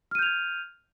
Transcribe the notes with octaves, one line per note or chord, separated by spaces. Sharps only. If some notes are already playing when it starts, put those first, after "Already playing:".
F6 G6 G#6 D#7 F7